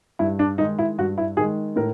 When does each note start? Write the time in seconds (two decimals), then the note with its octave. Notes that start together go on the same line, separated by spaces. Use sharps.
0.19 G2 E4
0.39 D4
0.58 D#3 G#3 D#4
0.79 E4
0.98 G2 F#4
1.18 E4
1.37 D#3 G#4
1.41 G#3
1.76 A2 A#4